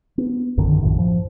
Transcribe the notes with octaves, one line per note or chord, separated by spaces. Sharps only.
B3
A#1 F#2 D3 D#3
A#1 F#2 A2
F3